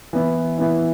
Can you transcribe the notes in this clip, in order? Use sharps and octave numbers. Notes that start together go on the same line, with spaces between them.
E3 B3 E4
E3 B3 E4